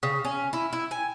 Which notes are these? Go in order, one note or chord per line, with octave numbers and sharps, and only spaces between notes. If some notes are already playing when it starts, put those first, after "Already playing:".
C#3
C#4
E4
E4
G#5